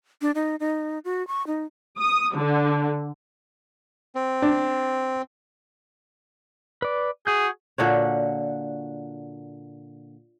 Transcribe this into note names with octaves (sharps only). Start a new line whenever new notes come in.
D4
D#4
D#4
F#4
C#6
D#4
D#6
D3
C4
D4
B4 D5
F#4 G#4 G6
A#2 D3 F#4 C#5